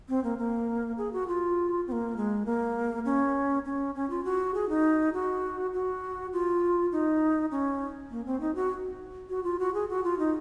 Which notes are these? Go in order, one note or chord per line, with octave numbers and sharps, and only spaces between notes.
C4
A#3
A#3
G#4
F#4
F4
C4
A#3
G#3
A#3
C#4
C#4
C#4
F4
F#4
G#4
D#4
F#4
F#4
F4
D#4
C#4
A#3
C4
D#4
F#4
F#4
F4
F#4
G#4
F#4
F4
D#4